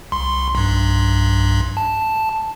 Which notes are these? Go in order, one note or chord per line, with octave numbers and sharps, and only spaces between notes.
C2 C6
B1 G2
A5